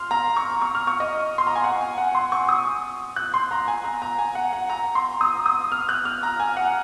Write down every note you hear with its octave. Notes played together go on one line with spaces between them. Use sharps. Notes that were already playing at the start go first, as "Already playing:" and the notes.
Already playing: C6 F6
A#5
C#6
C#6
F6
C#6
D#5
C6
A#5
G#5
F#5
G#5
F#5
C6
C#6
D#6
F#6
C6
A#5
G#5
A#5
A#5
G#5
F#5
F#5
A#5
C6
D#6
D#6
F6
F#6
F6
A#5
G#5
F#5